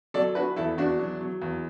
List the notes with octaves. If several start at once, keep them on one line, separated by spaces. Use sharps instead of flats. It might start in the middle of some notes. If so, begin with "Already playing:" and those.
F#3 A4 D5
D4 F#4 B4
E2 E4 A4
E2 D4 F#4
F#3
F#3
E2